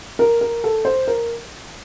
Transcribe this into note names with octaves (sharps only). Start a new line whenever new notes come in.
A#4
A#4
A4
C5
A#4